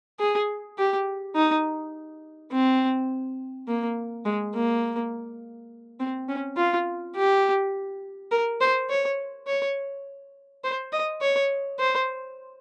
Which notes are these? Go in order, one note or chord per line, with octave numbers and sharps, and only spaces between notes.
G#4
G4
D#4
C4
A#3
G#3
A#3
C4
C#4
F4
G4
A#4
C5
C#5
C#5
C5
D#5
C#5
C5